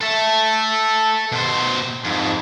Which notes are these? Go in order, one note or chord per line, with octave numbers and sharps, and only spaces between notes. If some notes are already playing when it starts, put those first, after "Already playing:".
A4 E5
B2 C5
F2 G#2